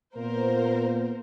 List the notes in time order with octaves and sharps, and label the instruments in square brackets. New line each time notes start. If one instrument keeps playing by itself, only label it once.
[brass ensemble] A#2 A#3 B3 [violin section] A#4 C5